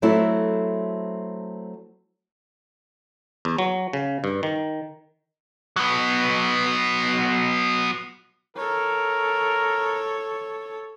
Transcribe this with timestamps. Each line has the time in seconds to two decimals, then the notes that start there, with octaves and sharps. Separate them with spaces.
0.02 F#3 A3 C4 E4 F#4 A4
3.45 E2
3.58 F#3
3.93 C#3
4.24 G2
4.43 D#3
5.76 F#3 B3
8.57 A4 A#4 C#5